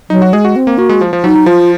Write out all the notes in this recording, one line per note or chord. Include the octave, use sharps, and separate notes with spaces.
F#3 D#4
F#4
G#3 G#4
F#4
C4
A#3
A#3 F#4
G#3
F3
F3
F#3 D#4
F#3
F3 F4